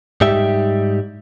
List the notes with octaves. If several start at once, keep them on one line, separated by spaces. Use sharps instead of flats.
G#2 G3 D#4 G4 E5